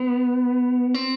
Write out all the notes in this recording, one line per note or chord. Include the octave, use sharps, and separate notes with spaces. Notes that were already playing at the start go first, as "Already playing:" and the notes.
Already playing: B3
C4